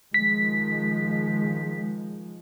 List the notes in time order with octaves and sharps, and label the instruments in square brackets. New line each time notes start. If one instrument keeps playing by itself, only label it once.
[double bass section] D#3 F3 G#3 [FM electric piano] B6